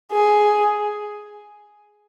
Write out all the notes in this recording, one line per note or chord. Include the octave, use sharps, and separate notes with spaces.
G#4